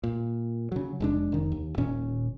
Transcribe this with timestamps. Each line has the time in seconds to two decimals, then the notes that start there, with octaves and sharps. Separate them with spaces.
0.04 A#2
0.72 C#3 F#3
1.00 F1 G#3 D4
1.32 F1 D#3
1.52 D#2
1.78 D#1 A#2 C#4